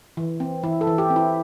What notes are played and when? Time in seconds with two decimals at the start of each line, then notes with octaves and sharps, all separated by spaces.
0.17 E3
0.40 C4
0.64 E3 E4
0.81 A4
0.87 E3
0.98 G4
1.10 C4
1.16 E4